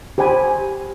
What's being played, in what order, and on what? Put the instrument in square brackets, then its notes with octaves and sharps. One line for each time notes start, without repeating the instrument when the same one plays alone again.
[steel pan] G4 C5 G5 G#5 B5